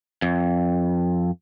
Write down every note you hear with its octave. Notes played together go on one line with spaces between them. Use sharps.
F2